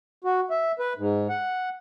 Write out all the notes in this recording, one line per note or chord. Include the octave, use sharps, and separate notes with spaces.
F#4
E5
B4
G#2
F#5